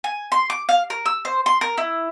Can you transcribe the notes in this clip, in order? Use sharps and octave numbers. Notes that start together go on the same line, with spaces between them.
G#5
C6
D6
F5
A#4
E6
C5
C6
A#4
E4